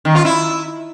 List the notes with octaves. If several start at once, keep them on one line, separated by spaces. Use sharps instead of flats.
D#3
F4
E4